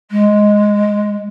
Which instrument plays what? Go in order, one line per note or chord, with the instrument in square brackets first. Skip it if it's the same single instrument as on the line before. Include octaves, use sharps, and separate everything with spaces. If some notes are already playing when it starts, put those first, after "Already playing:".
[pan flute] G#3